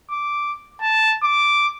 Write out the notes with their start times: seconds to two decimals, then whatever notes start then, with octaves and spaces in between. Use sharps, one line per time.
0.11 D6
0.82 A5
1.23 D6